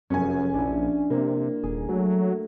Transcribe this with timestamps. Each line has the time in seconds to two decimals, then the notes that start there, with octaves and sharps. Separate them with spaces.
0.10 F1 F#2 C#4 G#4 C#5 G#5
0.54 A#1 D4 E4
1.10 C3 A#3
1.63 D#1 G#4
1.89 F#3 A3